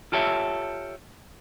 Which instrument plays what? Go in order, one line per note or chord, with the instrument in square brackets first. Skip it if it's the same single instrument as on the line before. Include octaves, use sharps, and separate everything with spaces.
[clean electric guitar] F4 G4 A4 C#5 E5